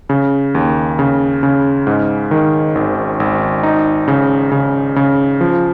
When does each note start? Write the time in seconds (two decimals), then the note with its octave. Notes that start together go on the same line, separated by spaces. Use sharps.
0.09 C#3
0.55 D#2
0.99 C#3
1.43 C#3
1.87 G#2
2.31 D#3
2.75 G#1
3.20 G#1
3.63 D#4
4.08 C#3
4.52 C#3
4.96 C#3
5.41 F3